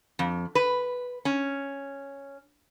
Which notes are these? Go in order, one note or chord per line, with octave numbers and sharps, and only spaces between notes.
F2
B4
C#4